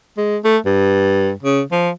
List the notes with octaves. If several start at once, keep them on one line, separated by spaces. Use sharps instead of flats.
G#3
A3
G2
C#3
F3